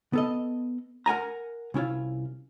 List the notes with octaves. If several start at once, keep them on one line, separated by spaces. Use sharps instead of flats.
B3 A4 D#5
A#4 F#5 G#5 A#5
C2 C#4 E4 F4